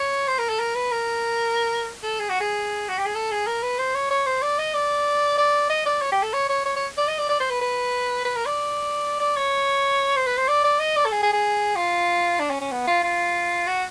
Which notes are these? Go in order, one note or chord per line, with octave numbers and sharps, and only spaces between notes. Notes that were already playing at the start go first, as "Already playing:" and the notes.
Already playing: C#5
C5
A#4
A4
A#4
B4
A#4
A4
G#4
F#4
G#4
F#4
G4
G#4
A4
G#4
A#4
B4
C5
C#5
C#5
C5
D5
D#5
D5
D5
D#5
D5
C#5
G4
A4
C#5
C#5
C#5
C#5
D5
D#5
D5
D5
C5
B4
B4
B4
A#4
D5
D5
C#5
C5
B4
C5
D5
D5
D#5
D5
A4
G#4
G#4
G#4
F4
D4
C#4
C#4
B3
F4
F4
F#4